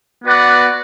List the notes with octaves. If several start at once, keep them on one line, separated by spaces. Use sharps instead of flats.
B3 F#4 B4 D5 F#5